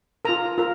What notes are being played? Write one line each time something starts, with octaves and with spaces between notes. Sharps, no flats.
F4 A#4 A#5
F4 A#4